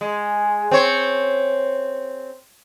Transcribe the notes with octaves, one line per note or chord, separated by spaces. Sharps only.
G#3
C4 C#5